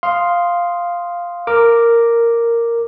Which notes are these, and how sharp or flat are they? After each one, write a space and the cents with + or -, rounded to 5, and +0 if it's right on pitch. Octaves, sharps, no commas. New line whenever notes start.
F5 +0 C6 +0 D#6 +0
A#4 -5 D6 +0